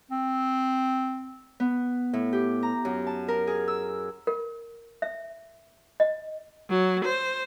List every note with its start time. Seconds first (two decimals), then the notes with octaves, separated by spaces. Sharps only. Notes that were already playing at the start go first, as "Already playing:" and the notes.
0.11 C4
1.60 B3
2.13 A2
2.33 G4
2.63 A#5
2.85 F#2
3.07 A5
3.28 A#4
3.47 G#4
3.68 E6
4.27 A#4
5.02 E5
6.00 D#5
6.68 F#3
7.04 C5